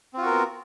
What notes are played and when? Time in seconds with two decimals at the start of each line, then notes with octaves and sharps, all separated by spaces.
0.14 C4
0.18 F4
0.22 F#4
0.26 A#4
0.30 B3